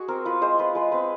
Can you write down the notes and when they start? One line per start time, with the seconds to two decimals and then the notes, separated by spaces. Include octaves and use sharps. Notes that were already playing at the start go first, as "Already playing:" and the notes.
Already playing: F#4 G#4
0.08 C4 A#4
0.25 F4 B4
0.41 G#3 C5
0.59 F4 B4
0.75 G#3 B4
0.92 C4 B4